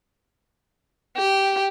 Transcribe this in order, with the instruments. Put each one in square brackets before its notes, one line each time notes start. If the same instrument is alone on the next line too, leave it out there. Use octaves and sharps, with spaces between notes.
[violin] G4